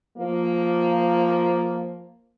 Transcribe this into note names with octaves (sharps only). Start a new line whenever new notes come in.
F3 A#3